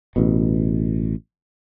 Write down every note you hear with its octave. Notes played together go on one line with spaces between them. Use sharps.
A1 B2